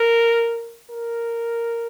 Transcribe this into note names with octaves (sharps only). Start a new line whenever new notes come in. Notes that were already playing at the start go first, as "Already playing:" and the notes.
Already playing: A#4
A#4